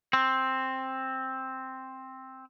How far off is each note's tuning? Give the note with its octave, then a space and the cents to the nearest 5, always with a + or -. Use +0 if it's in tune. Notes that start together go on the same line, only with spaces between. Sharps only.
C4 +5